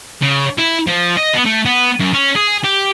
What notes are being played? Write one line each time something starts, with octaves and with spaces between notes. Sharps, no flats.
C#3
E4
F3
D#5
B3
A3
B3
F#2
C#4
G#4
G4